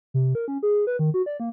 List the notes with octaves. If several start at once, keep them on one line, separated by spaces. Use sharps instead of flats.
C3
A#4
C#4
G#4
B4
D#3
F#4
D5
A#3